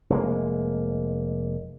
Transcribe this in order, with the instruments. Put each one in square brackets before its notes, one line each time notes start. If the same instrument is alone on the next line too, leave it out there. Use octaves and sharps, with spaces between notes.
[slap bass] F1 G#3 A#3